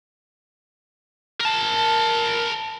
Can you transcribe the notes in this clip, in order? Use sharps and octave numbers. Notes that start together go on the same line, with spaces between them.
A#4 A5